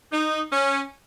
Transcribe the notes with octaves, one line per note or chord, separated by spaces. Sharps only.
D#4
C#4